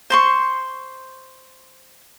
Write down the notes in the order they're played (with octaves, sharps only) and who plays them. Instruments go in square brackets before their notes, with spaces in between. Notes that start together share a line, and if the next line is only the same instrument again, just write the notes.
[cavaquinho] C5 C6 C#6